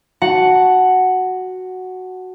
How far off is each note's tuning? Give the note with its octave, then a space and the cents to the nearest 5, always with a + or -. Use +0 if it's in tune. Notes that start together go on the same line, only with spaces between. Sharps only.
F#4 +0 F#5 +0 A5 +0